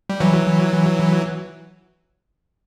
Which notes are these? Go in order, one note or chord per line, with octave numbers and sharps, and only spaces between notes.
G3
E3 F#3